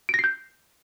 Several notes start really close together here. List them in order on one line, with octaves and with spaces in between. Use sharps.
D7 A#6 C7 G6